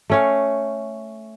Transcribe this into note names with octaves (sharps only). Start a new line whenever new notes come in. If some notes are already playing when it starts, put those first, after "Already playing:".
A3 C#4 F5